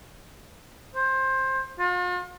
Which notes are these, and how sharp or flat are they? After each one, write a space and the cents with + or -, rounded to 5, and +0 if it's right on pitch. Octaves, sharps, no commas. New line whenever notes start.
C5 +20
F4 +45